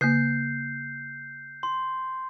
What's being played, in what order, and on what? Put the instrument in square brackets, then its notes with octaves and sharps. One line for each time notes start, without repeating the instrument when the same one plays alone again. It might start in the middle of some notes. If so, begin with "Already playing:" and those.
[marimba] C#3 A#3 [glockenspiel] F#6 G6 C7
[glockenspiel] C6